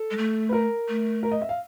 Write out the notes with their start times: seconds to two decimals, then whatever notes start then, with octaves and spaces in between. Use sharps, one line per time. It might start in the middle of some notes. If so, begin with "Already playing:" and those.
Already playing: A4
0.11 G#3
0.18 A3
0.49 B4
0.53 A#4
0.89 A3
1.23 A#4
1.32 D#5
1.42 E5
1.49 F5